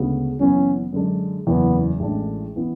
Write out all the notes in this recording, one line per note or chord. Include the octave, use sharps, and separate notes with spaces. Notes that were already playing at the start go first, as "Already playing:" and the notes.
Already playing: D2 C#3 G#3 B3 F#4
F#1 F#2 E3 B3 C#4
F#2 D3 G#3 D4
F#1 E2 C#3 E3 B3
A1 A2 G#3 D4
E3 B3